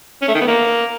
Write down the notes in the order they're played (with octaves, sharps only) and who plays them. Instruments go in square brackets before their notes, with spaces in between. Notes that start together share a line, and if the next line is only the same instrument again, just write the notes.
[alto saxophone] C#4
A3
D#3
B3
A#3